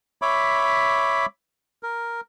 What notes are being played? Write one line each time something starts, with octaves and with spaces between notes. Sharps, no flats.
C#5 E5 B5 D6
A#4